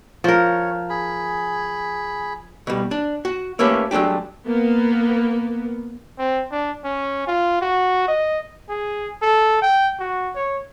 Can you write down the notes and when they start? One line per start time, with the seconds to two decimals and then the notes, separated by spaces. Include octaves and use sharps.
0.24 F3 A#4 C#5
0.90 G#4 B5
2.67 B2 G3
2.91 D4
3.25 F#4
3.59 A3 A#3 C#4 G4 B4
3.91 F#3 G#3 A3 D4 G4
4.46 A#3 B3
6.19 C4
6.52 D4
6.84 C#4
7.27 F4
7.62 F#4
8.08 D#5
8.70 G#4
9.22 A4
9.62 G5
10.00 F#4
10.35 C#5